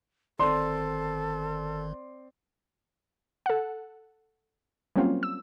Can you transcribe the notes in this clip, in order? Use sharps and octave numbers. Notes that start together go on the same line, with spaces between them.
G1 D#3 C4 A4 D5 C6
A4 F#5
F#3 G3 A#3 C4 C#4 F4
E6